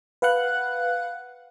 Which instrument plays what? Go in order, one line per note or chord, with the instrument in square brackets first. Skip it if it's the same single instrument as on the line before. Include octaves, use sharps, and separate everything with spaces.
[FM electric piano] B4 F5 F#5 F#6